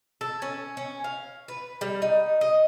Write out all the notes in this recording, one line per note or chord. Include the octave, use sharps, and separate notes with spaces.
A4
C#4
C#4
F5
B4
G3
D#4
D#5